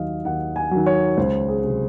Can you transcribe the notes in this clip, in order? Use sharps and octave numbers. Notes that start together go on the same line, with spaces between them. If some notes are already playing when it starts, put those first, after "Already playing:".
Already playing: D#2 D#3 F#3 D#5 F5
D#2 F#5
G#5
D#3 F#3
C#5
C#2 C5
G#4
C3 F#3